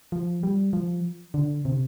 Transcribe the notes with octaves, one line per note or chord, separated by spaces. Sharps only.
F3
G3
F3
D3
C3